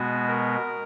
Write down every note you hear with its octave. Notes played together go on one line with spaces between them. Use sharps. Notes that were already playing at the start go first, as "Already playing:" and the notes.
Already playing: B2 G#3 B3 F#4
A#4